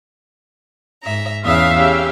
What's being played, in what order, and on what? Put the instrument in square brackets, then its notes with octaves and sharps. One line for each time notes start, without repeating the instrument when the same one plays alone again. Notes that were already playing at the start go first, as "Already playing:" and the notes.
[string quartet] G#2 E5 A#5
[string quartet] E2 C#3 D#6 [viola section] E5 F5
[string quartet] C#3 G4